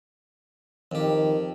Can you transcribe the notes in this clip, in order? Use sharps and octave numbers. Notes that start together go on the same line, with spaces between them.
F2 D#3 G4